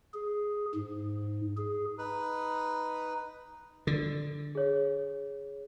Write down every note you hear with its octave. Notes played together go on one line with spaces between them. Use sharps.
G#4
G#2
G#4
D#4 B4
D3
G#4 C#5